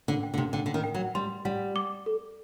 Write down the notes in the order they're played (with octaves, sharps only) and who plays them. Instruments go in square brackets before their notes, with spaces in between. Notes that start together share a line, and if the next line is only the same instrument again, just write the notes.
[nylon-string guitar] D3
[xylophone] G5
[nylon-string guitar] D3
C3
[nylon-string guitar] D3 [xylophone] G5
[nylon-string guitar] D3
D#3
[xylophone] G5
[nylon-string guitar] F#3
[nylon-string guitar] G3 [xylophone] C6
[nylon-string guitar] G3 [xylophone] F#5
[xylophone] D6
A4